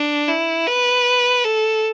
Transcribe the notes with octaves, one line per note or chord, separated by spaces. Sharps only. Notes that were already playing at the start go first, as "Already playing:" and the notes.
Already playing: D4
E4
B4
A4